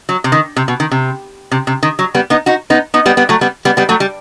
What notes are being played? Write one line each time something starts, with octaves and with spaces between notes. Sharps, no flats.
F#3
C3
D#3
C3
B2
D#3
C3
C3
C3
D#3
F#3
G3 B3
B3 D#4
D#4 F#4
B3 D#4
B3 D#4
G3 B3
G3 B3
F#3 A3
G3 B3
G3 B3
G3 B3
F#3 A3
G3